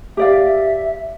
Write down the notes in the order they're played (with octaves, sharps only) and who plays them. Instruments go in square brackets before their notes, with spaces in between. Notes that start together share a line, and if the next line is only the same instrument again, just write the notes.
[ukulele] G4 D5 F5 [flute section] E5